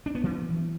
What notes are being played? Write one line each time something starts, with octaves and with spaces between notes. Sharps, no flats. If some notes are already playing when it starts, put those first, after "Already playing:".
D4
B3
E3